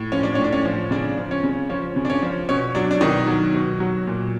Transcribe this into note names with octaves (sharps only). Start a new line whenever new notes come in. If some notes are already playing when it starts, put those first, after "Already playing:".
Already playing: A2
F3 C#4
D4
C#4
A2
D4
C#4
F3
C#3 D4
F3
C#4
C#3
F3 C#4
C#3
D4
C#4
F3
B2 C#4
F#3 D4
D4
B2 D#3 D#4
F#3
B2
F#3
A#2